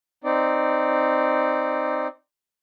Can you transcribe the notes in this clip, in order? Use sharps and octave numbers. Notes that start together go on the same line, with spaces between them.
C4 D#4 D5